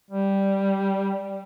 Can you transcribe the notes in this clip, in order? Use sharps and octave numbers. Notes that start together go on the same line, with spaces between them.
G3